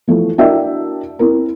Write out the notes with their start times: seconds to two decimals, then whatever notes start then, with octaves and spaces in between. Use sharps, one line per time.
0.07 E3 F3 A3
0.38 D4 E4 F#4 A#4 E5 G5
1.19 C4 E4 A#4